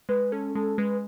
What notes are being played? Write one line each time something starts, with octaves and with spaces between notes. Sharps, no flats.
G#3 B4
C#4 A4
G#3 A4
G#3 B4